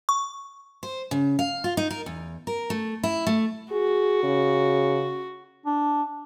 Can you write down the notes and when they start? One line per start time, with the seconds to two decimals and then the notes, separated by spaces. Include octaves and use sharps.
0.09 C#6
0.83 C5
1.11 C#3
1.39 F5
1.64 F4
1.77 D#4
1.91 A#4
2.06 E2
2.47 A#4
2.70 A3
3.03 E4
3.27 A3
3.72 F#4 G#4
4.23 C#3
5.66 D4